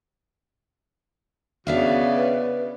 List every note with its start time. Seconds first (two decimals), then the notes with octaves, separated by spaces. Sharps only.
1.67 C#3 B3 D4 F#4 D5 E5 F5
2.16 B4